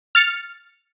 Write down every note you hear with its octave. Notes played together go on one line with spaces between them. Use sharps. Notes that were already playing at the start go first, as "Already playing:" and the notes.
F6 A6 C#7